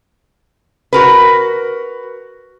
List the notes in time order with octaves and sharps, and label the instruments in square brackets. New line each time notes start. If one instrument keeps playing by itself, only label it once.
[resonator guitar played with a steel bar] F#4 A#4 B4